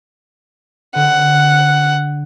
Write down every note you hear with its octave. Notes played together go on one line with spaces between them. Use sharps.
D3 F#5